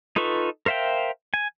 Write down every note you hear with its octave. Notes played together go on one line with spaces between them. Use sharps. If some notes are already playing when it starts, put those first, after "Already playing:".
D#4 F4 A4 B4 C#6
A#4 C5 E5 F5 G5
G#5